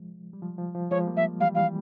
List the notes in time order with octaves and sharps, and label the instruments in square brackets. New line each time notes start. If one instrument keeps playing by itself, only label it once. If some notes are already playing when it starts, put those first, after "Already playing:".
Already playing: [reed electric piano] F3 G#3
G3
F3
F3
F3
[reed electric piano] F3 G#3 [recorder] C#5
[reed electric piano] G3 A#3
[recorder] E5
[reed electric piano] E3 G3 [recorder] F5
[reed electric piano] E3 G3 [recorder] F5